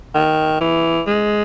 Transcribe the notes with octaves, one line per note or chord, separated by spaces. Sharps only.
D#3
E3
G#3